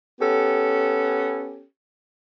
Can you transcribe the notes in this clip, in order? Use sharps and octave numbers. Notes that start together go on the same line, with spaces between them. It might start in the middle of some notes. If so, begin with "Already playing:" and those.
B3 C#4 G4 A4